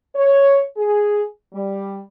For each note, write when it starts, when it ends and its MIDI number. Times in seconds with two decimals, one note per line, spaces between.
0.15 0.60 73
0.76 1.23 68
1.53 1.99 55